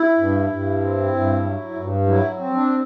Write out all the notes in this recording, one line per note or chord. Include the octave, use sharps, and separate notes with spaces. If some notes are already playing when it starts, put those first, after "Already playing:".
Already playing: E4
G2
G2
C4
G2
F#3
G2
F#3 E4
C4
D4